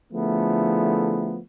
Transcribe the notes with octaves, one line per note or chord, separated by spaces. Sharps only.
D3 F3 A3 B3 E4 G#4